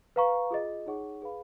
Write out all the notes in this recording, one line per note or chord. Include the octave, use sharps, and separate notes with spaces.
B4 F5 A#5 C#6
F4 G#4 D#5
D#4 G#4 C#5 F#5 C#6
G#4 B4 F5 B5